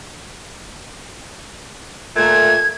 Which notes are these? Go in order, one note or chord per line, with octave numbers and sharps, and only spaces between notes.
A#2 A3 G#6